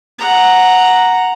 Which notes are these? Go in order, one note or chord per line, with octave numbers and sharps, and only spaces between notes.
F#5 A#5